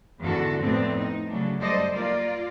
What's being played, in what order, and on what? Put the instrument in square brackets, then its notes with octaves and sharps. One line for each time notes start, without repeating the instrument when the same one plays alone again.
[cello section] E2 G#2 D3 E3 F#4 A4
F2 A2 A3 B3 C4 D4
D#4
C#3 F#3 A3 D4
F#2 G3 A4 C5 D5 D#5
A#3 F4 A#4 D5